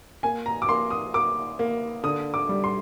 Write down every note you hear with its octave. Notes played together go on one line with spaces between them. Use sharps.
A#3 G#5
A#5
D6
A#3 C6
D#6
A#3 D6
A#3
D3 D#6
D6
G3
C6